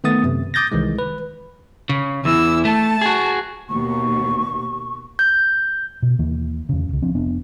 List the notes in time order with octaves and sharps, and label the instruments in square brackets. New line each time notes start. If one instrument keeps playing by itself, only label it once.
[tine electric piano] D#3 A3 B3 D#6 A6
F#2 C3
D6 D#6 G6 A6 A#6
C2 D#3 E3 G#3
B4
[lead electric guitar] C#3
[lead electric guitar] E2 [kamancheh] E4 E6
[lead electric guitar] A3 [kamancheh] A5
[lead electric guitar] F#4 G#4
[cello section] D#2 B2 [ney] C#6
[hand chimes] G6
[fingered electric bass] B2
D#2 E3 A#3
E2 C#3
E1 C#2
F3 C4 D4
F1 B3 D4